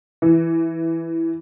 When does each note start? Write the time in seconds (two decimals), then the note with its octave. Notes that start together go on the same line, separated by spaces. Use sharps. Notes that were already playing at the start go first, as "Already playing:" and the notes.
0.22 E3